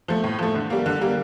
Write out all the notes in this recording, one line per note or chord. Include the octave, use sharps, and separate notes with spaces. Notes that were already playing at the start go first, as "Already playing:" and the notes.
F3 A3
A2
F3 A3
D3
G3 A#3
D3
G3 A#3